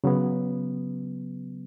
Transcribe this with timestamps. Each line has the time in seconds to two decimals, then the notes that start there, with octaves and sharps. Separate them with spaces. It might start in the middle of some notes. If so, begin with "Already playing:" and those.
0.04 C#3 F#3 B3